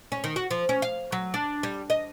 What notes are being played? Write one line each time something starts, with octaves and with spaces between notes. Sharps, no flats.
C#4
D#3
F#4
F3
C#4
F5
F#3
D4
G3
D#5